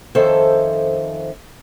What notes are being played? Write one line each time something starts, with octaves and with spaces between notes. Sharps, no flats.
F2 D#3 C#4 A4 C5 E5